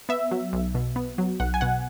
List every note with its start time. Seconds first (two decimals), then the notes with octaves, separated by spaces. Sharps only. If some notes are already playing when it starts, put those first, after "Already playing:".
0.09 B3 E5
0.31 F#3
0.53 B1
0.75 B2
0.96 B3
1.18 F#3
1.40 B1 F#5
1.54 G#5
1.61 B2 F#5